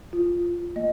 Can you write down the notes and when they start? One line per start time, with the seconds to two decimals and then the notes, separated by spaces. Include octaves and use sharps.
0.13 F4
0.76 A#3 D#5